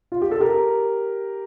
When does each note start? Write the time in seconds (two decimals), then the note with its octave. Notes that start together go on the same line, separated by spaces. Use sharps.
0.12 F4
0.22 G4
0.31 A4
0.40 G4 A#4